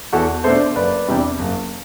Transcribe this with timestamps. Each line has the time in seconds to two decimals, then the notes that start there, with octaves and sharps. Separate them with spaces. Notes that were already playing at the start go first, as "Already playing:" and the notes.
0.13 E2 F#4 A4
0.44 B2 A3 D4 A4 C5
0.76 F#1 B4 D5
1.07 E2 C3 G3 D4
1.39 F#1